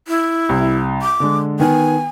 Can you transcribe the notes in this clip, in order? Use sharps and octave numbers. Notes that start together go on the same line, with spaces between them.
E4
C2
D6
D3 G#3
D#3 B3 G#5